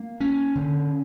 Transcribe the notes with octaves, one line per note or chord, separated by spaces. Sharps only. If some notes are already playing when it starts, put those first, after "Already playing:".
Already playing: A#3
C#4
D3